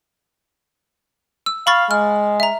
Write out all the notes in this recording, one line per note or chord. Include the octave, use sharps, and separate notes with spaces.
E6
F5 B5 C#6 A6
G#3 F6
E5 A#5